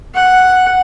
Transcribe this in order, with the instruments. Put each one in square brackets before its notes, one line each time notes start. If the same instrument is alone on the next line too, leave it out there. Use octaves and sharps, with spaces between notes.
[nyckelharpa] F#5